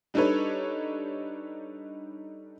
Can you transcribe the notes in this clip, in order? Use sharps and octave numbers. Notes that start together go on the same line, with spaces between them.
G3 D4 D#4 A4 B4 C#5